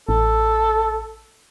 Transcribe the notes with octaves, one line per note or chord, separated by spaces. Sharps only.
A1 A4